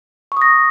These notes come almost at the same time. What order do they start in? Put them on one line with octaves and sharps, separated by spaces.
C#6 D#6 A#6